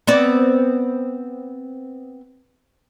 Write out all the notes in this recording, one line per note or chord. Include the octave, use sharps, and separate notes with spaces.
B3 C4 D5